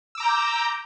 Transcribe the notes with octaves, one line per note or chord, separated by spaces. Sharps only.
A#5 D6 E6 G6